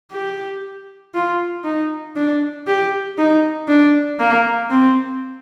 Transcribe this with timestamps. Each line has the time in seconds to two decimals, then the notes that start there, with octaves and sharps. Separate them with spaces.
0.12 G4
1.14 F4
1.64 D#4
2.16 D4
2.67 G4
3.18 D#4
3.68 D4
4.20 A#3
4.70 C4